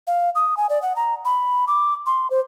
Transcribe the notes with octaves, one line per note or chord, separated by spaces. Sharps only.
F5
D#6
G#5
D5
F#5
A#5
B5
D6
C6
C5